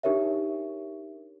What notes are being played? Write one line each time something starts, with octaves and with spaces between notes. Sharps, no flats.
D4 D#4 G4 A#4 C#5 E5